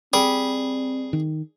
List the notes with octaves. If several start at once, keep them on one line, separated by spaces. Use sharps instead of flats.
G3 C4 G#4
D#3